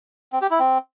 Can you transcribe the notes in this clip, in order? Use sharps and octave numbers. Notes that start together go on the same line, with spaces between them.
C4
G4
E4
C4